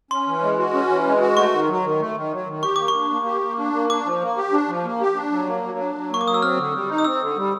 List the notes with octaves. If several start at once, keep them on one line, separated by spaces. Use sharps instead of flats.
C#4 C6
E3
G#3
F#4
C#4
E3
G#3
F#4
A3 C#6
D#3
F#3
D#3
A3
D#3
F#3
D#3
G4 C#6
A#3 D6
C#6
D4
A#3
G4
A#3
D4
A#3
D4 D6
F3
A#3
G4
D4
F3
A#3
G4
D4
F#3
A#3
F#3
D4
F#3
A#3 C#6
D6
F#3 D#6
E6
C4 F6
D3
G3
D#4
D#6
C4 E6
D3
G3